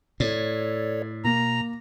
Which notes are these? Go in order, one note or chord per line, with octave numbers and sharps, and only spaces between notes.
A2 A4 C#5 D5
B2 A#3 A#5